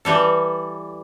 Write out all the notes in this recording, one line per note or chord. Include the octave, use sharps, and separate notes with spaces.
E3 G3 A4